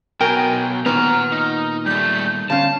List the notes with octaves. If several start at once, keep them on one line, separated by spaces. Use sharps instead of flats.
B2 F#3 A#4 G5 G#5
A#2 D#3 B3 F#5 A#5 F6
D#4
G3 A3 G6
D2 C#4 F5 A5